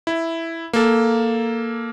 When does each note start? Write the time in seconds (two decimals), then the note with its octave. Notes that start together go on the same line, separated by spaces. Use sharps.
0.07 E4
0.73 A#3 A4